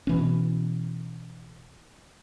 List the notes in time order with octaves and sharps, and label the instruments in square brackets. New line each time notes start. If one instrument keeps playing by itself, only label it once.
[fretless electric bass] B2 E3 C#4